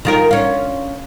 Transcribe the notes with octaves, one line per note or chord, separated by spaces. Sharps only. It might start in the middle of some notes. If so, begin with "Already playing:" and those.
D#3 F4 A#4
C#4 F4